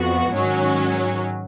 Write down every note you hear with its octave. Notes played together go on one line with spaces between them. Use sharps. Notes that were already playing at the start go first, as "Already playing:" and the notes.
Already playing: F2 F3 B3 F#4
G#2 D#3 F#3 C#4